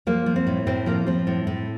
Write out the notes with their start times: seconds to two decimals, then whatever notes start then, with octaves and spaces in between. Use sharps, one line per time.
0.07 F3 A#3
0.26 F3
0.36 C4
0.47 A2
0.67 A2 C4
0.86 F3 A#3
1.07 F3 C4
1.27 A2
1.47 A2